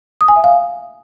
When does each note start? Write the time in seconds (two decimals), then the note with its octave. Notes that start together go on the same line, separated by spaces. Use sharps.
0.21 D#6
0.28 G#5
0.36 E5
0.44 F5